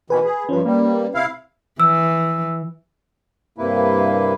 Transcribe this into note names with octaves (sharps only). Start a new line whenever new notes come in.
B2 D#3 E3 B4 G#5 B5
G#4
G2 F3 C#4 B4
G3 A#3
C3 E4 F5
E3 E6
G2 C3 A#3 E4 B4